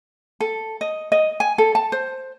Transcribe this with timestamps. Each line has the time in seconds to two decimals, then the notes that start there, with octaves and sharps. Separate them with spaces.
0.40 A4
0.81 D#5
1.12 D#5
1.40 G#5
1.58 A4
1.75 A5
1.92 C5